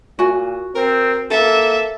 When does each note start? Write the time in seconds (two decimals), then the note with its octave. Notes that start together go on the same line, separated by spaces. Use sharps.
0.19 A#2 F#4 G#5
0.75 C4 A#4
1.31 A#3 A4 E5